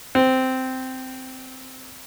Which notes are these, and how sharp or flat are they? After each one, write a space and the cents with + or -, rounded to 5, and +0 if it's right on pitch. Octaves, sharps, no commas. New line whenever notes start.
C4 -10